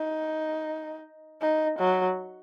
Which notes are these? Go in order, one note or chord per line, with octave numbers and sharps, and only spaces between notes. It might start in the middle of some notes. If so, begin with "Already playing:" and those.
Already playing: D#4
D#4
F#3